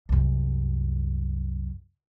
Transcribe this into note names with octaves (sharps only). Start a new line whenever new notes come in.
C2 F#2